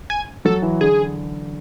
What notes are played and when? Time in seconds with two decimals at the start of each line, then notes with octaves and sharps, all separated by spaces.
0.10 G#5
0.45 F#3 A4
0.62 E3
0.81 D3 G#4